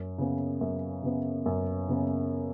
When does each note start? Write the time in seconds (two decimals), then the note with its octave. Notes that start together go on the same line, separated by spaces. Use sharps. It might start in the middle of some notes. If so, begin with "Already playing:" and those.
Already playing: F#2
0.18 C#3 B3
0.61 F#2
1.03 C#3 B3
1.46 F#2
1.89 C#3 B3